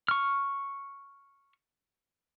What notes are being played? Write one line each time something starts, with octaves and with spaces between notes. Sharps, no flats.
C#6 F6